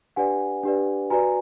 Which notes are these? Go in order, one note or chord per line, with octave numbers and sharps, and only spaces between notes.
D4 G4 B4 D5 F#5 G#5
D4 G4 B4 D5
F#4 B4 D5 G#5 A#5